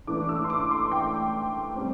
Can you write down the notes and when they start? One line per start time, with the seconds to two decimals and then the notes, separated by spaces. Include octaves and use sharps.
0.07 A2 E3 A3 D4 D6
0.29 E6
0.44 C6
0.50 D6
0.71 C6
0.92 G5
1.76 G3 C4